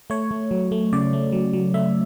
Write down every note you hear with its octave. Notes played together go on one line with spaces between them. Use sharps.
A3 C#5
A3
F#3
A3
C#3 D5
A3
F#3
F#3
A3 E5